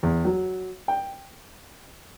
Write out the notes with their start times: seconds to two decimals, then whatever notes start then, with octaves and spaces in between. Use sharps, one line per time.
0.03 E2
0.25 F#3
0.88 G5